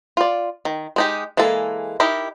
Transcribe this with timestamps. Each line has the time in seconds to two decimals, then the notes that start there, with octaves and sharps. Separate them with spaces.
0.17 F4 D5
0.65 D#3
0.96 G#3 D#4 G4
1.37 E3 G#3 A#3 A4
2.00 D#4 E4 G4 A#4 D#5